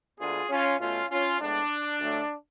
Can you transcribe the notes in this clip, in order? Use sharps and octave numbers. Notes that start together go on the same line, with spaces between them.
D2 D3 G#3 B3 F4 G#4
C#4 F4
B2 A3 C#4 F4
C#4 F4
A2 G#3 B3 D4
D2 D3 F#3 A3